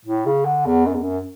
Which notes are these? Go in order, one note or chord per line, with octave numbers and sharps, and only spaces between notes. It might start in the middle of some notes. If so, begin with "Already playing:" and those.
A2
C#3
D3
E2
F#2
E2
F#2